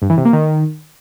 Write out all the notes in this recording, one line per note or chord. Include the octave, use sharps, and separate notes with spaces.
G2
E3
C3
A#3
D#3